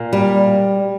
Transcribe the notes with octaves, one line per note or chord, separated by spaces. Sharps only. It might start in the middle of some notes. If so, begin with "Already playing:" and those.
Already playing: A#2
G3